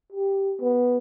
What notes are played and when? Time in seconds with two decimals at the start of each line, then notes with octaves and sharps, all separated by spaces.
0.12 G4
0.61 B3